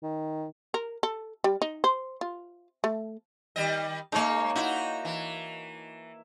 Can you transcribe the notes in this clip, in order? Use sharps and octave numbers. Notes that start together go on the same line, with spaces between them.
D#3
A#4
A4
G3
D#4
C5
F4
A3
D#3 G3 D#5
G#3 A#3 D#4 C#5
D#4 E4 F#4
E3